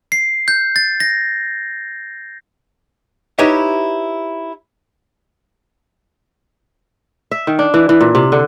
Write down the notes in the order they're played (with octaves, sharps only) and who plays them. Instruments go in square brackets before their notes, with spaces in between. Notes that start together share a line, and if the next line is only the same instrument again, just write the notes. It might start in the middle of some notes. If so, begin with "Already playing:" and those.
[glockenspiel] C7
G6
A6
A#6
[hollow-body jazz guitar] D#4 E4 G4 B4 C#5 E5
[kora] E5
D#3
D4
E3
E3
A#2
C3
D3